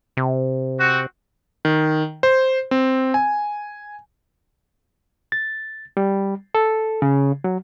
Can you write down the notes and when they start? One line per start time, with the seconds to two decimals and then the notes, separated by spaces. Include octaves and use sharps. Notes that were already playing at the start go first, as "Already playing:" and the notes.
0.17 C3
0.79 C4 F#4
1.65 D#3
2.23 C5
2.71 C4
3.14 G#5
5.32 A6
5.97 G3
6.55 A4
7.02 C#3
7.44 F#3